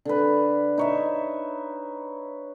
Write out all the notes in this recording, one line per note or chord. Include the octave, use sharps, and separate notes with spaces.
D3 B4
D#4 C#5 E5